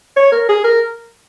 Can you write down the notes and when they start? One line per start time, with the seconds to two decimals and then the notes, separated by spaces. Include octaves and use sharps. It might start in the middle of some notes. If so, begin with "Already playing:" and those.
0.16 C#5
0.32 A#4
0.49 G#4
0.64 A#4